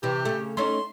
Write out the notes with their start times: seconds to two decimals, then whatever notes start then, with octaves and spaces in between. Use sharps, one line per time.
0.03 C3 E3 G4
0.25 C#3 A3
0.57 A3 C#4 D#4 C6